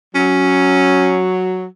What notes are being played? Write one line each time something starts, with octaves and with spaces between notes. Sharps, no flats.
F#3 C#4